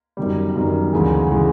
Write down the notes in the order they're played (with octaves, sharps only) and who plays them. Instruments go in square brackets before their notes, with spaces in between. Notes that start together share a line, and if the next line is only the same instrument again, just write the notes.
[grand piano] F#2 D#3 G3
F#2 D#3 G3
D2 C#3 E3 G#3
C#3 E3 G#3